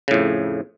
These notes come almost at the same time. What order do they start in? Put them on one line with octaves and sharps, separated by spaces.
C#3 A2 F2